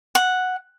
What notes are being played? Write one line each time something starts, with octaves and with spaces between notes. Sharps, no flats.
F#5